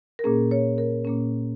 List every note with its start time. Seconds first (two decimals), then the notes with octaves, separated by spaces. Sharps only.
0.19 A#4
0.24 A#2 A#3 C#4 G#4
0.51 C#5
0.78 A#4
1.05 A#2 A#3 C#4